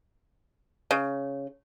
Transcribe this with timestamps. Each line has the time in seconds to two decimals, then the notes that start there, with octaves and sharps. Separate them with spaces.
0.91 C#3